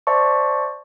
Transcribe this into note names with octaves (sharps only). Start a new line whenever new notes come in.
C5 D5 E5 A5 C#6